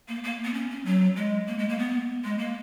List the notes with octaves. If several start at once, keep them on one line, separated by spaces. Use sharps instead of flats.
A#3
A#3
B3
C#4
C#4
F#3
G#3
A#3
G#3
A#3
B3
G#3
A#3